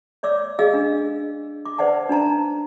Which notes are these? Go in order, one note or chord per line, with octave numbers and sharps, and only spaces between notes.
C#5 D5 D6 E6
G#4 D#5 F5 E6
D4
D6
B4 C5 D5 F#5 A5
D4 D#4 A5 A#5